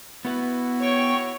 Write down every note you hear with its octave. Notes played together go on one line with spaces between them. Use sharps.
B3 E4 F#4 B4
C#5 G5 C#6